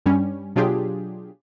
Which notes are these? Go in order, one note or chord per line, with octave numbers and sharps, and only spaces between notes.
G2 G3 C#4
B2 F#3 D4 F4 G4 G#4